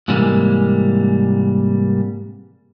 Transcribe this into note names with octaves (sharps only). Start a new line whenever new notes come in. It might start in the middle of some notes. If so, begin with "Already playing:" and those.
G#2 C3 E3 G3 G#3 A#3